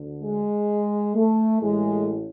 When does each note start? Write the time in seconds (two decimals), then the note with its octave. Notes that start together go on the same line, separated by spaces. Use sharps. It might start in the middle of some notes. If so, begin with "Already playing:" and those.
Already playing: D2 D3
0.22 G#3
1.15 A3
1.61 A1 A2 E3 G#3